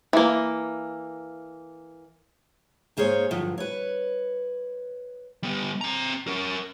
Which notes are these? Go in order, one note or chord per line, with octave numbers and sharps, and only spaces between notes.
E3 A#3
G#2 A#3 G#4 C5 C#5
G2 D3 F3 F#3
B4 C#5
G3 B3
C4 A#5
C#4 A#4